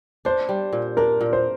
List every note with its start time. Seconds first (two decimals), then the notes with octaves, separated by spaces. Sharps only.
0.25 D4 C5
0.49 G3
0.73 A#2
0.97 D4 A#4
1.21 A#2
1.33 C5